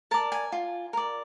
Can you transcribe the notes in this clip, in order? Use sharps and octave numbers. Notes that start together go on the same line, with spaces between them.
A#4 D5 A5
G#5
F4
A#4 D5